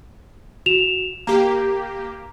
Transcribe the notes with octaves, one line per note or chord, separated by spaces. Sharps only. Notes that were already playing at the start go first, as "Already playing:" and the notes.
F#4 E7 F7
A#3 G4 A#5